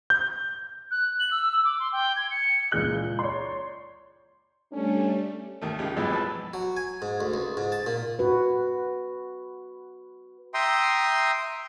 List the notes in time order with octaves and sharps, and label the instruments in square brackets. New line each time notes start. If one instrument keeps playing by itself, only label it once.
[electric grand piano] G6
[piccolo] F#6
F#7
E6
E6
D6
C6
G5
G#6
C#7
[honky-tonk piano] C#2 A#2 E3 G#4 G6 F#7
C#5 D5 C6
[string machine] G3 A3 [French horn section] C#4 D4
[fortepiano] D#2 D#3 A3
C#2 C#3 F3 G4
B1 F2 A2 E3 G#3 B3
B4 A5
[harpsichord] F#3
G#5
G#2
D2
C#2
G#2
A5
A#2
[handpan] F#4 B4
[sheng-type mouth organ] E5 G5 A#5 C6 D#6